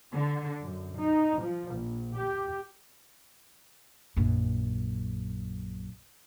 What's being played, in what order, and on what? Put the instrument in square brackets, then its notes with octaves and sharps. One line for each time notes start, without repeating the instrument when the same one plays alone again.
[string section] D3
F#2
D#4
F3
A#1
G4
[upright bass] A#1 F#2